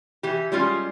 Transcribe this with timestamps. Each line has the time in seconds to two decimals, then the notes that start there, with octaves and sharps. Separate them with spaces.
0.23 E3 G4
0.52 G3 G#3 C#4 F4